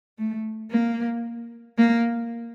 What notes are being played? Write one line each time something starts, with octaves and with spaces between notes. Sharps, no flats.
A3
A#3
A#3